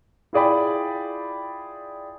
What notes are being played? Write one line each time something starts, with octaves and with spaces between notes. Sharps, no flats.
E4 F4 G#4 D5 G5 B5